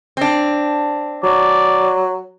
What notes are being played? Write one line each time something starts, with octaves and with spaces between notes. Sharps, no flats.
C4 D4
F#3 D5